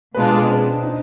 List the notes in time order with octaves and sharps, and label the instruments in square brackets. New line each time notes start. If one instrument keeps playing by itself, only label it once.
[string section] B2 G#3 D4 F4 [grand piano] B4
[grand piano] G#4
C4
D4
D#4